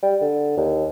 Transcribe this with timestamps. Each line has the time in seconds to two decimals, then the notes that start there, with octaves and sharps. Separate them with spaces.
0.03 G3
0.21 D3
0.57 D#2